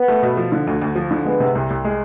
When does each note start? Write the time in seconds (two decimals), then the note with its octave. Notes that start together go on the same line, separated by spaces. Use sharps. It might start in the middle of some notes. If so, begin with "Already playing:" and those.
Already playing: B3
0.08 A3
0.23 B2
0.37 F3
0.52 D3
0.67 D2
0.82 D2
0.95 F3
1.11 D3
1.25 G#3 B3
1.40 C3
1.55 C2
1.70 C2
1.85 G#3